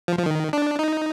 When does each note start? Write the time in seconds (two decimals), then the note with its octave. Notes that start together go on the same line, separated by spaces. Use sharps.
0.08 F3
0.19 F3
0.26 D#3
0.53 D4
0.79 D#4